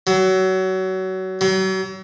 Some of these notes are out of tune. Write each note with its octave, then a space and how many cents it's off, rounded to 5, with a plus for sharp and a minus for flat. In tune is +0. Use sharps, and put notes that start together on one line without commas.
F#3 +25
F#3 +40